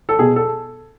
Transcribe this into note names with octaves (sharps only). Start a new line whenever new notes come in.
A4
B2 G#4
A4